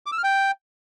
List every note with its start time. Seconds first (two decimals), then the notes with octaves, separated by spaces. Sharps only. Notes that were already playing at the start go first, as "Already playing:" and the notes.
0.06 D6
0.12 E6
0.18 F6
0.24 G5